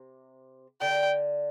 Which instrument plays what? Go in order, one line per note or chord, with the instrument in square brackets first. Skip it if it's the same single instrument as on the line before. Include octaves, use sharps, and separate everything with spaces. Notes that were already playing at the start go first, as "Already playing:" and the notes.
Already playing: [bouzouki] C3
[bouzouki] D3 [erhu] G5